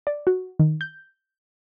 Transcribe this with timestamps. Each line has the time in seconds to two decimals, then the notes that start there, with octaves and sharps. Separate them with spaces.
0.07 D5
0.27 F#4
0.59 D#3
0.81 G6